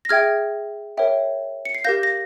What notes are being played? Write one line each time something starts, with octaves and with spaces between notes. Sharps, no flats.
A#6
G#4 E5 G5 F6 G#6
A#4 C#5 E5 G5
C#7
C7
G4 A#4 F5 G6 A#6
A#6